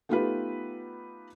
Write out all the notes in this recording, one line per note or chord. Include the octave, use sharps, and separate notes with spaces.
A3 B3 D#4 F4 G4 B4